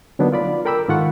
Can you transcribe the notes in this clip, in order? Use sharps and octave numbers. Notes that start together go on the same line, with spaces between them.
D3 F#3 A#3 B3 D4 D#4
F4 D5 B5
A4 A#4 G5 B5 D6 E6
G#2 D#3 F4 A4 F#5 C#6